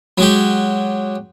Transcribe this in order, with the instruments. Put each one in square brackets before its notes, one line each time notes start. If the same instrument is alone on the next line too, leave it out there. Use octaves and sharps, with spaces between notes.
[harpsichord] F#3 G#3 G4